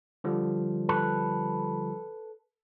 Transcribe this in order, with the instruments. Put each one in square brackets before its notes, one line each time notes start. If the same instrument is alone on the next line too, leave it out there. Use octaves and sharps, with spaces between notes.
[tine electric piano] D3 F3 G3
[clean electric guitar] A4 B4